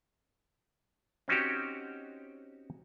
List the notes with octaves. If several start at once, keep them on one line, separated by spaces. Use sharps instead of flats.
C4 C#4 D#4 F#4 G4